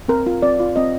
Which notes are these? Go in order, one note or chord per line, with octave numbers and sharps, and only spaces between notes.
C4 A#4
F4
C4 D5
F4
C4 D#5